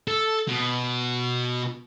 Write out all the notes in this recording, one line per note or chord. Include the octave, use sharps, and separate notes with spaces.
A4
B2